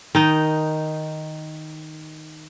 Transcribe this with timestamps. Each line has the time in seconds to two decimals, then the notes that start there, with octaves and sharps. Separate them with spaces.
0.15 D#3 D#4